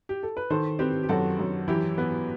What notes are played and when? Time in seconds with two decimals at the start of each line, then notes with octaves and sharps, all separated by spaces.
0.09 G4
0.23 A4
0.37 B4
0.50 D#3 A4 C5
0.79 C4 G4 B4
1.03 G4
1.09 F#2 F#4 A4
1.39 F#2
1.68 E3 E4 G4
1.98 B3